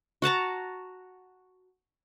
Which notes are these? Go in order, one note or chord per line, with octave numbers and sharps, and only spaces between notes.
F#4 F#5 A5 A#5